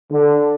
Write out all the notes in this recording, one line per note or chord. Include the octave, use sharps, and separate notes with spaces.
D3